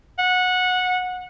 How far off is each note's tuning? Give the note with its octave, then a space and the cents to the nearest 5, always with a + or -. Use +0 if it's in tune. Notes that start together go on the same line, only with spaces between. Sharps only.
F#5 -15